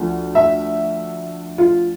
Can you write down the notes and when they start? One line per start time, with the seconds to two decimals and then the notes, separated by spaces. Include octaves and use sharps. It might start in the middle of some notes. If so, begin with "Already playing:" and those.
Already playing: D2 D3 F3
0.35 E5
1.58 F4